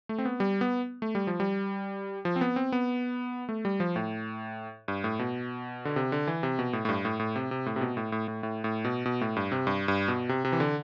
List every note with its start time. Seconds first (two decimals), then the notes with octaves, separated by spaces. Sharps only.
0.09 A3
0.18 C4
0.25 B3
0.40 G3
0.61 B3
1.02 A3
1.15 G3
1.27 F3
1.40 G3
2.25 F3
2.36 C4
2.41 B3
2.56 C4
2.72 B3
3.49 A3
3.65 G3
3.80 F3
3.96 A2
4.88 G2
5.04 A2
5.19 B2
5.85 D3
5.96 C3
6.12 D3
6.27 E3
6.43 C3
6.59 B2
6.73 A2
6.85 A2
6.89 G2
7.05 A2
7.20 A2
7.36 C3
7.51 C3
7.66 A2
7.76 C3
7.81 B2
7.97 A2
8.12 A2
8.28 A2
8.43 A2
8.64 A2
8.85 B2
9.06 B2
9.21 A2
9.36 G2
9.52 C3
9.67 G2
9.88 G2
10.08 B2
10.29 C3
10.45 C3
10.52 E3
10.60 D3